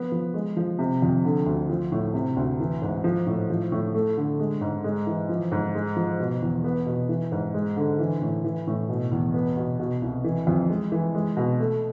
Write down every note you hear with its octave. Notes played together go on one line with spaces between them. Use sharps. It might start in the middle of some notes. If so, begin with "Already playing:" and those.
Already playing: F3 B3
F3
G#3
F3
C3
F2
D3
D2
F3
A2
C3
D2
E3
G#2
F3
A2
F3
A2
A3
D3
G#3
G#2
G#3
E3
F3
G#2
G#3
F3
B2
E2
B3
B2
E3
G#2
G#3
D3
E3
A2
E3
A2
B2
E2
B3
B2
B2
C2
E3
F2
G#3
E3
G#3
B2
A3